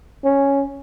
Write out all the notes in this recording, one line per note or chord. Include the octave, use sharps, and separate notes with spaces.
C#4